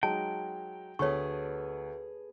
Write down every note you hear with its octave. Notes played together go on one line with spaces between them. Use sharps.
F#3 G#3 D#4 G5 A5
D2 B3 G#4 A4 C#5 C#6